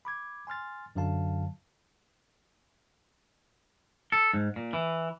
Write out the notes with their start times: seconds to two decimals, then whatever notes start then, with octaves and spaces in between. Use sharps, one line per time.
0.05 B5 D6 G#6
0.47 G#5 C6 F6 A6
0.96 F#2 D3 F#3 F5 A5
4.12 A4
4.33 G#2
4.56 A#2
4.73 E3